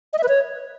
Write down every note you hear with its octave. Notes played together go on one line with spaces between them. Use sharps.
D#5
E5
B4
C#5